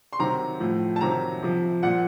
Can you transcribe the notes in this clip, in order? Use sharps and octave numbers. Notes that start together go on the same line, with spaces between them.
C6
C3 D#3 F#3 A#5
A2 F3
A5
C3 D#3 F#3 A#5
C3 F3
A#2 F3 F#5